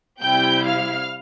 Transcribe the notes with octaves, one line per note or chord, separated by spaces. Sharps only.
C3 G3 C4 E4 G5 G6
F5 F6